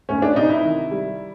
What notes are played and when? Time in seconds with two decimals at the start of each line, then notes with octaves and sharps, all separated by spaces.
0.09 D2 C#4
0.22 D4
0.36 C3 D#4
0.49 E4
0.64 D#3
0.91 G3